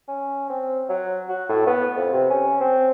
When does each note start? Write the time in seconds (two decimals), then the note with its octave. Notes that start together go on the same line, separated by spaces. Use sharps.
0.08 C#4
0.49 C4
0.89 F#3
1.29 F#4
1.49 A2
1.66 B3
1.96 F2
2.12 C3
2.30 C#4
2.60 C4